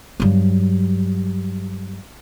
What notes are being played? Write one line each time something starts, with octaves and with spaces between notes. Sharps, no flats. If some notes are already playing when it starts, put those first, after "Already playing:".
G2 F#3